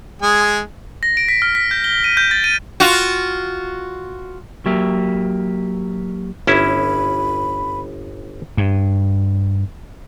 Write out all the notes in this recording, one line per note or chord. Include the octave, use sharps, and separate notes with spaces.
G#3 G#4 G#5
A#6
D7
B6
F6
B6
G6
G7
D#7
G6
A6
D#7
F4 F#4
F#3 A#3 G4 E5
G1 C#4 E4 B5
G2